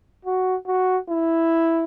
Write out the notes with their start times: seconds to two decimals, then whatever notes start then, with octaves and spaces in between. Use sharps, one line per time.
0.25 F#4
0.67 F#4
1.10 E4